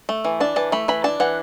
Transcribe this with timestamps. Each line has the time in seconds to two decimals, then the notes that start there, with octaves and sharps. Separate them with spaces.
0.09 A3
0.25 E3
0.40 D4 A5
0.56 E3 A5
0.72 A3 B5
0.88 E3 B5
1.04 D4 A5
1.20 E3 F#5